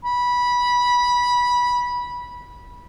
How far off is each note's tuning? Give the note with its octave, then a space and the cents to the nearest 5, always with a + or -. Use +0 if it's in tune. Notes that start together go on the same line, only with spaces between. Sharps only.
B5 -15